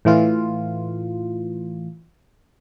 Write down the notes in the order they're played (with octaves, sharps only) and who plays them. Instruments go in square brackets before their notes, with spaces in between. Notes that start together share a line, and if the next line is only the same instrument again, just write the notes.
[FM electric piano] A2 E3 F4